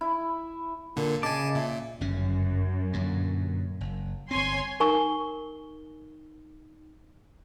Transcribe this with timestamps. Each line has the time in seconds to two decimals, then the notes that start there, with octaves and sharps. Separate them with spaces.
0.01 E4
0.96 A#2 D3 A#4
1.23 C#3 D#5 G#5 A5 D6
1.55 A#2 E5
2.01 G1 F#2 C#3 C#4
2.93 G2 A#2 D3
3.81 F#1
4.31 G1 C4 C#5 G#5 C6
4.80 D#4 A#4 G#5 C#6 G7